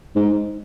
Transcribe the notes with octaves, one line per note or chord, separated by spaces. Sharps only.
G#2